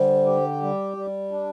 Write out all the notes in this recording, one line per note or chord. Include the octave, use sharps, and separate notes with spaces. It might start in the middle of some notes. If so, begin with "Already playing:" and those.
Already playing: D3 G3 C5
G4
G3
G3
D4